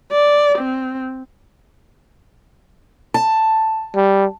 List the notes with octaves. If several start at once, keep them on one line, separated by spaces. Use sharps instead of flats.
D5
C4
A5
G3